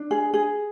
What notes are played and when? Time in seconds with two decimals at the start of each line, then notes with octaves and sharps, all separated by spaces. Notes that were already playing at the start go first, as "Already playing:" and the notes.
Already playing: D4
0.11 G#4
0.34 G#4